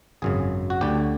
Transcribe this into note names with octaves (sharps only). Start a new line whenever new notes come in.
G#1 F#2 C#3 G#4
F#4
D2 D3 G4